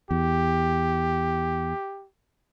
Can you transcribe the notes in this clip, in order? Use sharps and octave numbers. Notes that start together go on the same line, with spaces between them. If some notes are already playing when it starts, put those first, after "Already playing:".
E2 G4